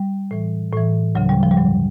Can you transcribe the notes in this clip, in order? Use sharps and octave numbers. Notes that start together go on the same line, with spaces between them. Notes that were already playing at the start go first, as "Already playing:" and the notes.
Already playing: G3
A2 E3
A2 E3
D2 C#3 F3 F#3
G3
F3
G3
G2 D3 F3 F#3